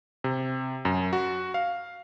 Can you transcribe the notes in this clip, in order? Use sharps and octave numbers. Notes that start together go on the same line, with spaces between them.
C3
F#2
F#4
F5